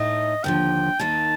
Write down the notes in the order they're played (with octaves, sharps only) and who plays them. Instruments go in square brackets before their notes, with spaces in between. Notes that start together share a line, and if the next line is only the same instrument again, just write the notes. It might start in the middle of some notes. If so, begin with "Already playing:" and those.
Already playing: [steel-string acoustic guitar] A2 A3 D#4 [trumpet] D#5
[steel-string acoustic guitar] D#2 D3 F3 [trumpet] G5
[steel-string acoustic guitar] D#2 D#3 A#3 D#4 [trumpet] A5